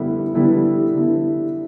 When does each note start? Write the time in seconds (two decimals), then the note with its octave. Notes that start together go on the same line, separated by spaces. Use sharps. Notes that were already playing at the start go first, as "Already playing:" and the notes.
Already playing: D3 G3 B3 E4
0.34 D3 G3 B3 E4
0.95 D3 G3 B3 E4